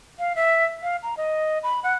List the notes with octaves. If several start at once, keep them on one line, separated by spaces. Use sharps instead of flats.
F5
E5
F5
A#5
D#5
B5
F#5